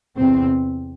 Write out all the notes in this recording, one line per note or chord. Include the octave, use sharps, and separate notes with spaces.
E2 C3 C4